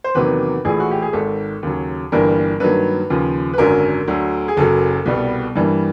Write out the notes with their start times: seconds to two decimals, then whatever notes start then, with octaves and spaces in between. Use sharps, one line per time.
0.04 C5
0.15 E2 C3 D#3 F#3 A#3 B4
0.65 A#1 A2 E3 G#4
0.80 F#4
0.91 G4
1.02 G#4
1.13 G#1 G#2 D#3 A4
1.63 D#2 C#3 F#3
2.12 G1 G2 E3 G3 A#3 A#4
2.60 G2 D#3 F#3 A#3 B4
3.10 D#2 C#3 F3
3.53 B4
3.58 G#1 F#2 D3 F#3 A#4
4.08 D2 D3 F#3
4.48 G#4
4.57 F#1 F#2 C#3 F#3 A4
5.06 C2 B2 G3 B3
5.56 G2 E3 G3 A#3